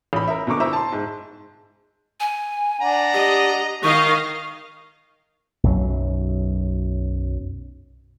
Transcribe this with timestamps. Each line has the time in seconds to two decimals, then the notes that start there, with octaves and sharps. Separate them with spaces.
0.13 A1 B5
0.28 A#4 E5
0.47 B2 D3 A#4 C#6 D6
0.60 E4 C5 E5 A#5 E6
0.73 A5 C6
0.92 G#2
2.20 G#5
2.81 D4 F#5 A#5
3.14 G4 D#5
3.83 D#3 D#5 F5 C#6
5.64 B1 F#2 F#3